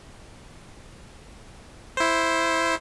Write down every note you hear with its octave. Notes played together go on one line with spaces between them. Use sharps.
E4 C5